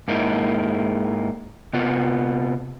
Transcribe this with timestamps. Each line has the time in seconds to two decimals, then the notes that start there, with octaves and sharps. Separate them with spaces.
0.08 G#2 A#3 D#4 E4
1.73 C3 B3 F4